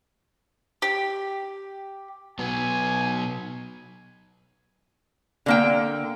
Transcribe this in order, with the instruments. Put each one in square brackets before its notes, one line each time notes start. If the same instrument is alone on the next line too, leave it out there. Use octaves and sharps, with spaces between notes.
[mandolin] G4
[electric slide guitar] B2 F#3 B3 [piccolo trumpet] G#5
[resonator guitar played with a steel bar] D3 A#3 G5